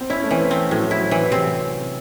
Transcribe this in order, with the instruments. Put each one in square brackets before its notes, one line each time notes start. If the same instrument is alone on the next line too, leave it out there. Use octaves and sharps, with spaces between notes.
[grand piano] C4
[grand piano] C#4 [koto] E4
[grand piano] A3
[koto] E3 [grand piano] C4
[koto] C4
[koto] A2 [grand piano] F#3
[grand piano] F#3 [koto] E4
[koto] E3
[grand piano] C3 [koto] C4